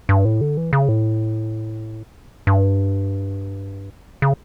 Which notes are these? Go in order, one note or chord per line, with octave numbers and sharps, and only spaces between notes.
G2
A2
D3
E3
C#3
A2
G2
C#3